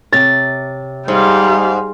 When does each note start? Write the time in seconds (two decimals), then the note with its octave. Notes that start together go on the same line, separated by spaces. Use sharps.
0.12 C3 C#5 A6
1.08 G#2 G3 F5